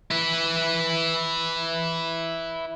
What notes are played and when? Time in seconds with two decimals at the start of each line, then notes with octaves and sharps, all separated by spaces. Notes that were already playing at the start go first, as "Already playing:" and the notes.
0.11 E4 B4